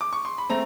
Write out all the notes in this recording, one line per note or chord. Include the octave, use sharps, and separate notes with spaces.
D6
C#6
C6
B5
A3 C4 A#5